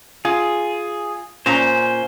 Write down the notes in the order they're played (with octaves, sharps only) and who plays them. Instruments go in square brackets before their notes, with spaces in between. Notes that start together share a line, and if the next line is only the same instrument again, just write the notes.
[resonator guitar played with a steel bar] F4 [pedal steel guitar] G#4
[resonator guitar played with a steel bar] A#2 C#4 A#5 [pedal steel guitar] C5